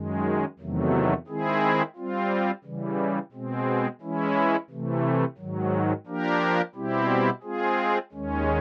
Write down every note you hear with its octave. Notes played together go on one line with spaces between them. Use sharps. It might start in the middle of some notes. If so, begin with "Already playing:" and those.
Already playing: F#2 D#3 G#3
E2 C3 D#3 F#3 A3
D#3 G#3 C4 E4 G#4
G3 C4 F4
C#3 E3 G3
B2 G#3 C4
E3 G#3 C#4 E4
C3 E3 A3
G#2 D#3 F#3
F3 A#3 D4 G4 A#4
B2 G3 C4 E4 G4
G#3 C4 F4 G#4
D#2 D#3 G#3 C#4